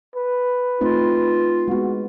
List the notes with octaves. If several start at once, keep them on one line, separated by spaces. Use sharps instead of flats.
B4
A3 C4 D#4 F4
G#3 B3 F#4